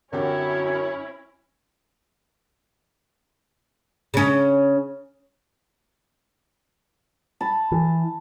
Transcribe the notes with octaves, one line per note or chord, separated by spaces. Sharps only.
F#2 D3 C4 C#4 E4 G4 C#5
C#3 C#4
A5 B5
E3